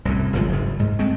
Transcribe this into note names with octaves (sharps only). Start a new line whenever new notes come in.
C2 F#2 A2
G1 F#2 F3 G#3
F#1 G#2
G#2
G#3 A3 C4